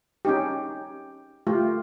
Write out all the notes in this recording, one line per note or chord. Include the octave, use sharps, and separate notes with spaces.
C#4 D#4 G4
A3 F4 G4